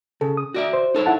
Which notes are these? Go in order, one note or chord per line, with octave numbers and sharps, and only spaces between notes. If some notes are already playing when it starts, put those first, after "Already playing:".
C#3 A4
D#6
F#4 D5 E5
C5
D#4 A4 C#5
E4 F#5 A5